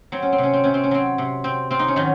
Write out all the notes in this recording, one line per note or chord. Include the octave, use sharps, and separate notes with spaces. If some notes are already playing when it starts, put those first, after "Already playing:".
F#3 C4
C#4
C4
C3 C#4
C4
C3 C#4
C4
C#4
F#3 C4
C3
C4
C4 F4
D#4
C#4
D#3 F#3 D#4